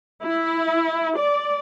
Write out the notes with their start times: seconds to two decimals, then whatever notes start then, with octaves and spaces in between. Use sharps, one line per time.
0.23 E4
1.17 D5